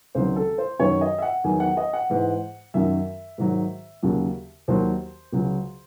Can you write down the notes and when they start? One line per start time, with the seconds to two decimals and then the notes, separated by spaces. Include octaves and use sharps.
0.15 C#2 C3 D#3 F#3 C5
0.36 A4
0.58 C5
0.79 F#2 D#3 F#3 C#5
1.01 D#5
1.18 E5
1.22 F#5
1.44 E2 D#3 F#3 G#5
1.60 F#5
1.77 D#5
1.93 F#5
2.10 G#2 E3
2.74 F#2 D#3 F#3 E5
3.38 G#2 D#3 F#3
4.03 D#2 C#3 F#3
4.68 D#2 D#3 F#3 C5
5.32 C#2 C#3 F#3